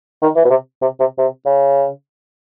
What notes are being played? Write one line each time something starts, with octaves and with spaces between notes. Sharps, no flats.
D#3
E3
B2
C3
C3
C3
C3
C#3